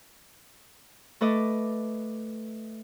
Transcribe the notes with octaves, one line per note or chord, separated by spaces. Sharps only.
A3 A4 B4 D#5 D6